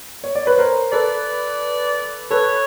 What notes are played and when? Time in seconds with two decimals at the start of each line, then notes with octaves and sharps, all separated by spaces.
0.24 C#5
0.35 D5
0.46 B4 C#5
0.58 A#4 C5
0.92 A4 B4 D5
2.31 A4 B4 C#5